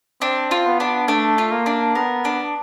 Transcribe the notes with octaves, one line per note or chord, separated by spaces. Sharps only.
C4 D4
F4
B3
D4
A3 D4
F4
A#3
D4
B3 A#4
D4